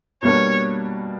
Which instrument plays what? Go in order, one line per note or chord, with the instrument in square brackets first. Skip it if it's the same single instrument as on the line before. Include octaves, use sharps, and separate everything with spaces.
[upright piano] B2 G3 A#3 D4 [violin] C#5